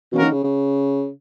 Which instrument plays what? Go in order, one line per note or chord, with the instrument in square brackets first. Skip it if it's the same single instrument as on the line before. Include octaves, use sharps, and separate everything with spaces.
[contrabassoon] B2 [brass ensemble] E3 A#3 C#4 F#4 A#4
[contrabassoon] D#3
C#3
C#3